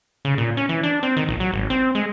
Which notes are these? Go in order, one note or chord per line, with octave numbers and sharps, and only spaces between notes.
C#3
A#2
C#4
E3
D4
C4
D#3
A#1
F#3
G#1
C4
G#3